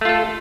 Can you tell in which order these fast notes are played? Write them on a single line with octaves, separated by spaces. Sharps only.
A3 F4 A4